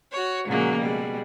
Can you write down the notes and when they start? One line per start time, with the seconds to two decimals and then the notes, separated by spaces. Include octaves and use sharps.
0.12 F#4 C#5
0.45 A#2 C#3 F3 F#3 G#3 A#3
0.78 B2 G3 G#3